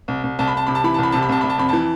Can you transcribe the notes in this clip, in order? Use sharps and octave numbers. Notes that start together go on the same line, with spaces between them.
C2
C2
C2 A5
B5
C2 A5
C3 B5
A5
E3 B5
C2 A5
B5
C3 A5
B5
C2 A5
C2 B5
A5
F2 B5
E3 A5